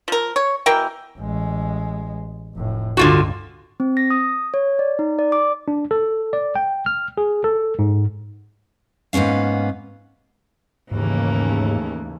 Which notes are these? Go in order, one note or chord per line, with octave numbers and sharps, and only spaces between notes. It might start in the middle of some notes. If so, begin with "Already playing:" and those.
F3 A#4
C#5
B2 E3 A#4 G5
A1 G#3
F1 A2
C#2 G2 D3 F4 F#4
C4
A#6
D#6
C#5
D5
D#4
D5
D6
D4
A4
D5
G5
F6
G#4
A4
G#2
G#2 A#3 B3 C#4 F5
D#2 G#2 C#3 E3 A3 A#3 C#4